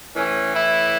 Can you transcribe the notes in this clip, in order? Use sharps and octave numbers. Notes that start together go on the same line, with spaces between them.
A2 E3 C#4
E4